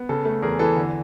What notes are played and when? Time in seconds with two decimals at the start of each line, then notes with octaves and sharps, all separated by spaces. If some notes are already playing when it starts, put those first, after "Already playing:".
Already playing: B3
0.09 C#3 A4
0.25 A3
0.42 E2 G#4 A#4
0.59 E3 A4 B4
0.76 D3